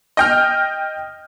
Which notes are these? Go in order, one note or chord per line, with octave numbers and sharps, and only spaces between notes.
D#5 G5 F6